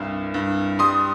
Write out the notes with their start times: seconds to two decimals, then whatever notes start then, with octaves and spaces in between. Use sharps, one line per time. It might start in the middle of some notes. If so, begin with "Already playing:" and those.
Already playing: C2 G2
0.34 G2
0.79 G3 C6 D#6